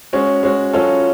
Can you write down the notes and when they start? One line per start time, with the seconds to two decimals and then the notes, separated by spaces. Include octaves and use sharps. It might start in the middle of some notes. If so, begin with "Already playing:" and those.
0.13 G#3 C#4 F#4
0.43 G#3 C#4 F#4
0.73 F#3 C#4 F4 A4